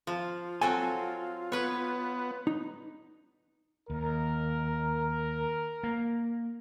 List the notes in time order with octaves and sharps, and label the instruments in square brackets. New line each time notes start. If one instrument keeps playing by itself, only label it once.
[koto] F3 [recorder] F4
[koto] F#3 C4 A4 [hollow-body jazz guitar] G#5
[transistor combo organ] B3 [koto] B4 C#5
[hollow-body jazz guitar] D#4
[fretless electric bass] D#2 [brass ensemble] A#4
[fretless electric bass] A#3